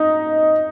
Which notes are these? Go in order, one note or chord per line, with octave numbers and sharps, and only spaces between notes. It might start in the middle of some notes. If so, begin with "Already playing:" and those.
Already playing: D#4